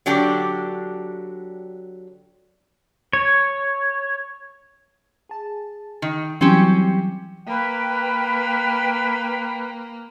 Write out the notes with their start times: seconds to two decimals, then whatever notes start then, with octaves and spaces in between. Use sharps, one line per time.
0.06 D3 F#3 D4 G4
3.13 C#5
5.29 G#4 A5
6.02 D#3
6.41 E3 F#3 G3 C4 C#4 G4
7.47 A#3 B4 G5